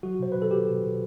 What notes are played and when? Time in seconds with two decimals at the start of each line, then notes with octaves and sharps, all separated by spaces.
0.03 F#3 F#4
0.19 B2 C5
0.32 F#3 B4
0.42 A4
0.51 F#3 G4
0.67 B2
0.83 B2